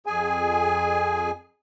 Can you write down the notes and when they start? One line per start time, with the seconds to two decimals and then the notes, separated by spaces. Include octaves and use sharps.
0.06 F2 G#4 G#5